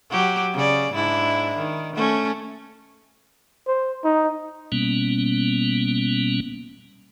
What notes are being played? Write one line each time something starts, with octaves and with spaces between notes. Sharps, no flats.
F#3 G4
C#3 D5
G#2 D4 E4
D#3
A3 C#4
C5
D#4
B2 G3 A#3 B3 C#4